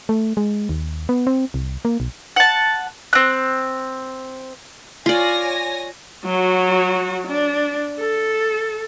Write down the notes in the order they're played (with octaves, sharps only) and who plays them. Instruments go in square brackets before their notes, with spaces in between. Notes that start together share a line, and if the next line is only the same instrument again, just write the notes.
[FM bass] A3
G#3
D#2
B3
C4
C2
A#3
B1
[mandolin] F#5 A5
C4 F#6
[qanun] F4 D5 [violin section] C#5 G#5 A#6
[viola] F#3 F#4
D4
A4